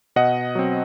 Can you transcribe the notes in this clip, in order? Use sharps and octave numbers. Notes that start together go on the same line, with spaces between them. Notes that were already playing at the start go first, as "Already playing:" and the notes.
B2 D#5 F#5
F#3 C4